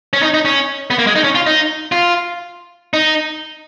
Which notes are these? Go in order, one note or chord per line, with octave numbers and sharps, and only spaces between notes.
C#4
D#4
D#4
C#4
B3
A#3
G#3
D#4
C#4
F4
D#4
F4
D#4